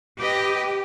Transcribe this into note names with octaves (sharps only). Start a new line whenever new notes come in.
G4 B4 D#5